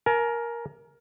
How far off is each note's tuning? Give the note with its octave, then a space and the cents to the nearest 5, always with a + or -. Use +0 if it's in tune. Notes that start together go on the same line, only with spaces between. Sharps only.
A#4 +10 G#5 +40